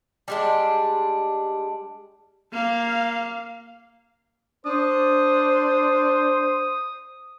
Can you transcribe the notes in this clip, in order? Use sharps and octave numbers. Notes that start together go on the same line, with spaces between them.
G3 G#3 D4
A#3 F5
D4 C5 D#6